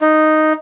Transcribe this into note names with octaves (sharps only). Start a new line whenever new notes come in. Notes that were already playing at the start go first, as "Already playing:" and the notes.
D#4